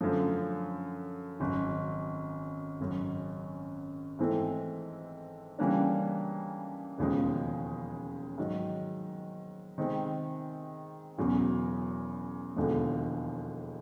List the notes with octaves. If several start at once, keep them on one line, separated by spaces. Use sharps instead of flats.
F#2 D3 F3 A3
G#1 F#2 C#3
G#1 F#2 C#3
G#2 E3 A3 C4 E4
C#3 E3 G3 A#3 D4
E1 D#2 C#3 F3 G#3
G#2 D#3 F#3
C3 D#3 G#3 C4
E1 E2 C#3 F#3
E1 D#2 D3 F3 G#3